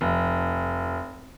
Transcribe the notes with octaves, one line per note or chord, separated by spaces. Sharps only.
F1